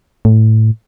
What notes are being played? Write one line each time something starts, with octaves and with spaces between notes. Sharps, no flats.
A2